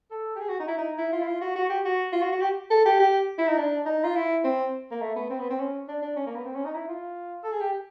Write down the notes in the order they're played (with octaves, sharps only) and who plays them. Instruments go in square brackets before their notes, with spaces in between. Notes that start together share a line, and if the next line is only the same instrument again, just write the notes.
[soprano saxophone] A4
G4
G#4
F#4
D#4
E4
D#4
E4
F4
E4
F4
F#4
F#4
G4
F#4
F4
F#4
F#4
G4
A4
G4
G4
E4
D#4
D4
D#4
F4
E4
C4
A#3
A3
B3
C4
B3
C4
C#4
D4
D4
C#4
A#3
B3
C4
C#4
D#4
E4
F4
A4
G#4
G4